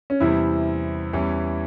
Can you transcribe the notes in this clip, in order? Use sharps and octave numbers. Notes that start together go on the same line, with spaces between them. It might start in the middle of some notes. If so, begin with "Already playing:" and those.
C#4
E2 C3 G3 C4 E4
E2 E3 G3 C#4